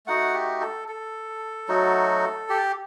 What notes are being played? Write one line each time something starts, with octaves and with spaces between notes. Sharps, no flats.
A3 D#4 F#4 F#5
G4
A4
A4
F#3 A3 D#4 F#4
G4